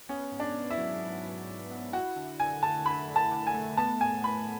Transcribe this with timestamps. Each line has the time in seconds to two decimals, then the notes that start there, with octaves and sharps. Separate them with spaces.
0.09 B3 C#4
0.32 G#2
0.40 D4
0.55 G#2
0.70 E4
0.78 F#3
1.01 B3
1.24 G#2
1.47 G#2
1.71 F#3
1.93 E4 F#4
2.16 D3
2.39 D3 G#5
2.62 A3 A5
2.85 E4 B5
3.08 D3
3.16 A5
3.31 D3
3.47 G#5
3.54 A3
3.77 B3 A5
4.01 A2 G#5
4.24 A2 B5